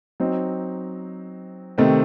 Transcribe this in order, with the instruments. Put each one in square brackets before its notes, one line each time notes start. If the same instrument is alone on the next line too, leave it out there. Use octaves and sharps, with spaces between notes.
[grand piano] F#3 C4 D#4
C3 D#3 A3 C4